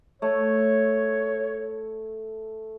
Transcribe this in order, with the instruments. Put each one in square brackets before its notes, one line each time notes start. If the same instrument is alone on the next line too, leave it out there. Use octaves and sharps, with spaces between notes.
[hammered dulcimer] A3 [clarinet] C#5